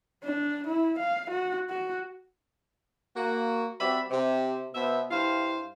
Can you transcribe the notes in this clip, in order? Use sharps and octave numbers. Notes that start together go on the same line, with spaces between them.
D4
E4
F5
F#4
F#4
A#3 F#4
G3 C4 F#4 D5 E5 B5
C3
B2 B3 C5 E5
G2 E4 G4 C5 F5